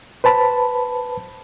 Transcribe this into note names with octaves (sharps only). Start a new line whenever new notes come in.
B4 C5 A5 B5